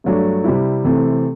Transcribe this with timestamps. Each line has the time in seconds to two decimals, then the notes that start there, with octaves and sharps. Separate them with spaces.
0.04 G2 F#3 A3 D4
0.44 C3 G3 C4 E4
0.84 C3 E3 A3 C4